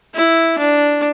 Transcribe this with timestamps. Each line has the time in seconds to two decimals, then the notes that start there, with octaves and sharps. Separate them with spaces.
0.14 E4
0.58 D4